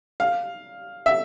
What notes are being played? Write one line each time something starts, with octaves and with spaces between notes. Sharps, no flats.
F5
E5